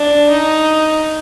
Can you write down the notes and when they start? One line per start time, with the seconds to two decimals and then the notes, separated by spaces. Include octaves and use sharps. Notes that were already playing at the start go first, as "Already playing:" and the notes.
Already playing: D4
0.29 D#4